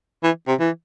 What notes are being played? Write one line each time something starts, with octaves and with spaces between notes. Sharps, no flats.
E3
C3
E3